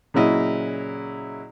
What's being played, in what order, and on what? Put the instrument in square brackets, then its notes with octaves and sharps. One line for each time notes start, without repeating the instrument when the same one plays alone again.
[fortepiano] A#2 C#3 F#3 E4 D#5